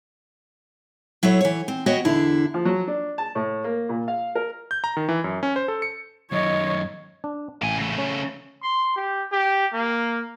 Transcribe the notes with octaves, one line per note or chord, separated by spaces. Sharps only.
F#3 E4 A4 C#5
E3 C#5
C4
B3 F#4 C#5 D#5 G5
E2 D3 D4 E4
F3
F#3
D4
A5
A2
A#3
A#2
F5
A#4
G6
A#5
D#3
E3
F#2
C#4
C5
A4
C#7
F#2 D#3 C#5 D#5
D4
A1 A#3 G#5
C#3 A3
C#4
C6
G4
G4
A#3